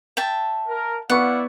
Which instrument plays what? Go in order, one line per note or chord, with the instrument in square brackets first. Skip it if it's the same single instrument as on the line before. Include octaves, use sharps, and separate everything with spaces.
[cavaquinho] E5 G5 A5
[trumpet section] A#4
[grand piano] B3 C#6 [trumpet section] E4 D5 F5 [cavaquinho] F#5